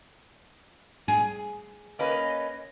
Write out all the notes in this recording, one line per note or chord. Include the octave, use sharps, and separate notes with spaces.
G#4
A#3 C#4 B4 D#5